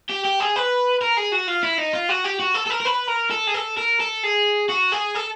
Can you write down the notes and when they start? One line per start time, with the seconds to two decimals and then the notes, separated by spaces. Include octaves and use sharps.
0.10 G4
0.25 G4
0.40 G#4
0.56 B4
1.01 A#4
1.17 G#4
1.32 F#4
1.48 F4
1.63 E4
1.78 D#4
1.93 F4
2.09 F#4
2.24 G4
2.39 F#4
2.55 A4
2.66 A4
2.70 A#4
2.81 A#4
2.85 B4
3.08 A#4
3.31 A4
3.48 G#4
3.54 A4
3.77 A#4
4.00 A4
4.24 G#4
4.69 F#4
4.92 G#4
5.15 A4